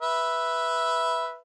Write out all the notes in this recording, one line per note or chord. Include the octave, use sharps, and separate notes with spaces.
B4 E5